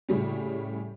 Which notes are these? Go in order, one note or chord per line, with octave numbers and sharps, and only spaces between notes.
A2 C#3 G3 C#4